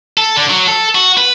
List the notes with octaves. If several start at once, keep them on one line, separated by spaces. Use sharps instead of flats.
A4
D3
F#3
A4
F#4
B4